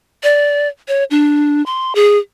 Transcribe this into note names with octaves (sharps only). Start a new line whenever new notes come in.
D5
C#5
D4
C6
G#4